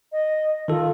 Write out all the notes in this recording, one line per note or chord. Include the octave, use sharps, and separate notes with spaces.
D#5
D#3 F4 A4